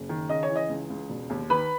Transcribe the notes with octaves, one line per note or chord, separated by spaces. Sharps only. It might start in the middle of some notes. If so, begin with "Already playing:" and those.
Already playing: F#1
D#3
C#3 D#5
C#5
E3
D#5
C#2
C#2
E1
D#2
D#3 B4 B5